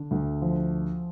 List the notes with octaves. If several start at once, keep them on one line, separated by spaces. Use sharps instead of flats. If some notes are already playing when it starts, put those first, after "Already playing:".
Already playing: D3
D2
F3